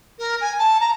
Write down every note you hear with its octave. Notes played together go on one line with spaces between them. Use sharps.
A#4
G#5
A5
A#5